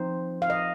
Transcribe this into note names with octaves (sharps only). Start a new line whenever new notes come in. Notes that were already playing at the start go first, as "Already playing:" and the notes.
Already playing: F3 C4 D#4 C5
F5
D#5